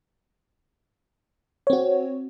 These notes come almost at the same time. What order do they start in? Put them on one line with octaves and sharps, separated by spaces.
C#5 C4 F#4